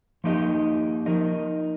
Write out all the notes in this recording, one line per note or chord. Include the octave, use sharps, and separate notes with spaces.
F3 A#3 D#4 G4 D#5
F3 D#4 A#4 D#5